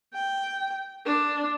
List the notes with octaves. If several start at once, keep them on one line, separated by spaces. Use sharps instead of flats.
G5
D4